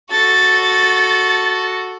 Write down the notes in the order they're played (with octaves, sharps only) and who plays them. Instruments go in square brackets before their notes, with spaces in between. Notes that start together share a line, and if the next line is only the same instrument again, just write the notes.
[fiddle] F#4 A4 [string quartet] A6